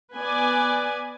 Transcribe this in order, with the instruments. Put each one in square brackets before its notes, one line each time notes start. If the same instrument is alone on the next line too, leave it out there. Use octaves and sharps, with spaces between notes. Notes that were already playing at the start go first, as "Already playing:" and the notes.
[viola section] B3 B4 D5 G#5